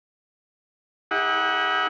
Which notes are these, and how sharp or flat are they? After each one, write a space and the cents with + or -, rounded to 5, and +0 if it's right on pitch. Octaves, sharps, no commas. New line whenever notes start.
E4 -45 G4 +45 F#5 +0